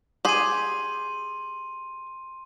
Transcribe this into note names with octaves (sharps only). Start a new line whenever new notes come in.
G4 G#4 C6 D#7